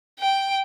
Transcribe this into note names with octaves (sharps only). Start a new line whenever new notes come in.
G5